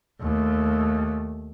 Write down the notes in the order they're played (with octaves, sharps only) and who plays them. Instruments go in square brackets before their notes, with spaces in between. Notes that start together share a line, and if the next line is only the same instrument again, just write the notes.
[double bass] D#2 A3